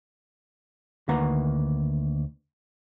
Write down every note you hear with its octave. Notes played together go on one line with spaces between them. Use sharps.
D2 D#3 A#3 B4 F#5 A#5